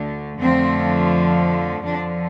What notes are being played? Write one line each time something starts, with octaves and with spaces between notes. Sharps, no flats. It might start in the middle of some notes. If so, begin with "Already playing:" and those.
Already playing: D2 D3 A3
F2 D3 F3 A3 C4
F2 D3 F3 D4